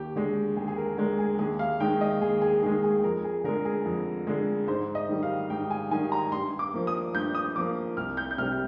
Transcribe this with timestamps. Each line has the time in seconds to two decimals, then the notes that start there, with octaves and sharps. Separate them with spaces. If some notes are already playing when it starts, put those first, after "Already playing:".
Already playing: D#2 G4
0.16 D3 G#3
0.57 D#2 G#4
0.68 G#4
0.77 A#4
0.97 D3 G#3 A#4
1.19 G#4
1.39 D#2 G#4
1.59 F5
1.80 D#3 G#3 G5
2.01 D#5
2.21 D#2 G#4
2.42 G#4
2.62 D#3 G#4
2.66 G#3
2.83 G#4
3.04 F2 A#4
3.24 G#4
3.44 D3 A#4
3.48 G#3
3.65 G#4
3.85 F2
4.27 D3 G#3
4.68 G#2 C5
4.95 D#5
5.09 D#3 G3
5.23 F5
5.50 G#2 G5
5.70 G#5
5.91 D#3 G3 G#5
6.12 A#5
6.32 G2 C6
6.59 D6
6.74 F3 A#3
6.87 D#6
7.14 G2 G6
7.35 D#6
7.56 F3 D6
7.58 A#3
7.97 C2 F6
8.17 G6
8.31 G6
8.38 C3 G3 F6